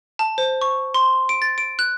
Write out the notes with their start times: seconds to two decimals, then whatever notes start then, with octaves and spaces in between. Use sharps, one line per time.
0.19 A5
0.38 C5
0.61 C#6
0.94 C6
1.29 D7
1.42 A6
1.58 D7
1.79 F#6